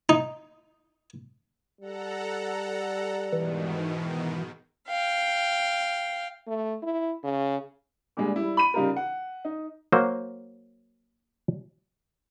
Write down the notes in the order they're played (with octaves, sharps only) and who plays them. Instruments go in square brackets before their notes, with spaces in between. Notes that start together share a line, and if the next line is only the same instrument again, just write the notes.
[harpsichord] D#4
[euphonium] G3 [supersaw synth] A4 F#5 A#5
[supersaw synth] G#2 B2 D#3 [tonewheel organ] E3
[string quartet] F5 G5
[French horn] A3
E4
C#3
[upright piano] A#2 D3 G3 G#3
G3 E4
B5 D#7
C#3 G3 D#4 F4 G4 A#4
F#5
D#4
[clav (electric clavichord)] F#3 A#3 F#4 C5